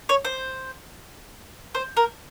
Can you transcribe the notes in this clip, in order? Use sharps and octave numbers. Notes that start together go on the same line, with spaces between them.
C#5
C5
C5
A#4